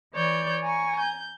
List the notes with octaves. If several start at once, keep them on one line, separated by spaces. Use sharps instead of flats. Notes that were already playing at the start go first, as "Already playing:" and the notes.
E3 C#5 D5 G6
G#5 A#5 C#6
G6